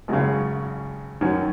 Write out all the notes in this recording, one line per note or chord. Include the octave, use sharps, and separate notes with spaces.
G#1 F#2 C#3
F#2 D#3 F#3 C#4